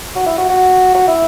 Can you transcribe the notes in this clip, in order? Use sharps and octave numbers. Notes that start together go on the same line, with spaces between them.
F#4
E4
F#4
F#4
F#4
E4